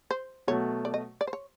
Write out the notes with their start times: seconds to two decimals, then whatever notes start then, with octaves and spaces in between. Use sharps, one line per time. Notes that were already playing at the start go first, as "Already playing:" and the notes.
0.11 C5
0.47 B2 F#3 A3 C#5
0.85 D5
0.94 D#5
1.21 D5
1.27 C5
1.33 C#5